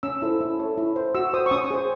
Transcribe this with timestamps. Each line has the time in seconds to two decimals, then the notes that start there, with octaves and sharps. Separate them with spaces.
0.03 C#4 E6
0.22 E4 A4 C5
0.41 E4
0.60 A4 C#5
0.78 E4
0.96 C5
1.15 F#4 E6
1.34 C5 D#6
1.46 C#6
1.51 C#4 D#6
1.71 G#4 C5